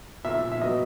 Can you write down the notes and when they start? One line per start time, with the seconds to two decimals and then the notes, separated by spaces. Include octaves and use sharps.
0.25 A#2 E5
0.52 E5
0.62 F#3 B3 D#5